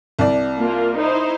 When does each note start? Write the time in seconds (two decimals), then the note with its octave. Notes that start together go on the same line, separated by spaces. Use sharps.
0.19 C2 D5
0.58 A#3 F4 A#4
0.98 D#4 E4 C5